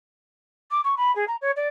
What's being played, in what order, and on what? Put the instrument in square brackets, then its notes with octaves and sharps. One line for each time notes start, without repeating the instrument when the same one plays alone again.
[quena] D6
C#6
B5
G#4
A#5
C#5
D5